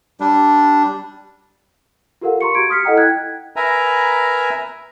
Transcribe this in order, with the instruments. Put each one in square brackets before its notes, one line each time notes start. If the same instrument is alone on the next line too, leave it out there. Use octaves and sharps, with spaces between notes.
[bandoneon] G3 D4
[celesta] F4 G4 A4 A#4 F5 F#5
A#5 C6 C#6 C#7
F#4 G4 G#6 D7
D#6 F6 B6 C#7
E4 A4 D#5 F#5 G5 A#5
E4 G5 F#6 G#6
[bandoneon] A#4 B4 E5 G#5 A#5